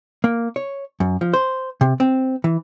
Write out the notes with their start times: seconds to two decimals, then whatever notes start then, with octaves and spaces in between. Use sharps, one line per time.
0.24 A#3
0.56 C#5
1.00 F#2
1.21 F3
1.34 C5
1.81 C3
2.00 C4
2.44 E3